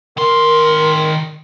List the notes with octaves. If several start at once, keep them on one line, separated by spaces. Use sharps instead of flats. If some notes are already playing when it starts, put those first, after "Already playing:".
D#3 A#4 C6